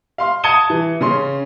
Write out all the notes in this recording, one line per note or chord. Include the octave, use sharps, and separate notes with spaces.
F5 C6
A5 D#6 G#6 C#7 D#7 G7
E3
C#3 C#4 C6